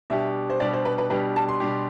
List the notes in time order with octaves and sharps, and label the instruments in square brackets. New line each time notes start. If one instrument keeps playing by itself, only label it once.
[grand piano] B2 G3 D4 G4 [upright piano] E5
[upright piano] C5
[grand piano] B2 G3 D4 G4 [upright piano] D5
[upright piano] C5
B4
B4
[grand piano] B2 G3 D4 G4 [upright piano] B4
[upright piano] A5
C6
[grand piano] B2 G3 D4 G4